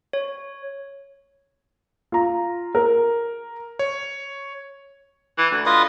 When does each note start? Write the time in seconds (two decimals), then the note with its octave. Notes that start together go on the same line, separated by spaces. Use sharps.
0.13 C#5
2.12 F4 A#5
2.75 A#4
3.79 C#5
5.38 E3
5.51 D2
5.66 F4 B4 D#5